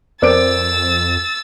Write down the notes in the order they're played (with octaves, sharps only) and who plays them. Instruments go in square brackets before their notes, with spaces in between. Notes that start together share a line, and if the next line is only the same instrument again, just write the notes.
[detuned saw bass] F2 [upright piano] C4 D7 [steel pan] A#4 D5 [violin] E6 A6